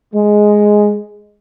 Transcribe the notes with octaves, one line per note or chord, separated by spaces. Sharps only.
G#3